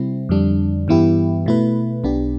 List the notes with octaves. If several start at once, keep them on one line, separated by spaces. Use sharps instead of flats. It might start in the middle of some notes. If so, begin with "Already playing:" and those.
Already playing: C3 G3 C4 E4
F2 D3 G3 D4
G2 E3 B3 E4 G4
B2 A3 E4 B4
B1 B2 B3 D4 G4